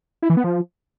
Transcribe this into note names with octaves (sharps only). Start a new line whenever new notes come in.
E4
E3
B3
F3